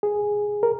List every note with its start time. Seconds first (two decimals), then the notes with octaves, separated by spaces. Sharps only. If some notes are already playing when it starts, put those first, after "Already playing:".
0.03 G#4
0.63 A#4